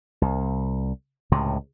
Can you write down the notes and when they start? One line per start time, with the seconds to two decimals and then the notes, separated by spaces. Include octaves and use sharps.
0.22 C2
1.32 C#2 A2 C3